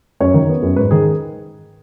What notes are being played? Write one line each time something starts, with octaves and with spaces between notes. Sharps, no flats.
F#2 C#5
D#3
B3
F#2
G#2 B4
D#3 G#4